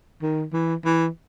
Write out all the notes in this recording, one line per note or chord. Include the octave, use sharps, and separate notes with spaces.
D#3
E3
E3